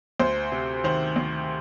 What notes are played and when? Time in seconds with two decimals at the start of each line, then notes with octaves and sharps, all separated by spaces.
0.20 D2 C5
0.52 C3
0.84 D#3 C5
1.16 D2